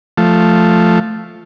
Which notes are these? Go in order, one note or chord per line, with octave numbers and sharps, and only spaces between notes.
F3 A3